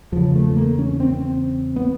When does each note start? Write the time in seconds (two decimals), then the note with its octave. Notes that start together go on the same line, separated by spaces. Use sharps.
0.12 E2 C#3 F3
0.35 A3
0.56 A#3
0.79 C#4
1.00 C4
1.76 B3